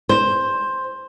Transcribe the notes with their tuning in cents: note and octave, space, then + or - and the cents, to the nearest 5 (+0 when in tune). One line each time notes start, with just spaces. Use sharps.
C5 +10